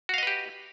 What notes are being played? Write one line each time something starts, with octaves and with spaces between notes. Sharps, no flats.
F#4 G4 B4 D#5 F5